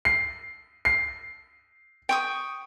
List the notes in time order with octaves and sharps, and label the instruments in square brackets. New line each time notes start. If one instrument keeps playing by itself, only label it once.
[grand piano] C7
C7
[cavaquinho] G5 C#6 D#6